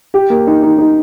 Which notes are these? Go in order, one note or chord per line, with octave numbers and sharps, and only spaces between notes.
G4
A#3
D#4
D#4
D#4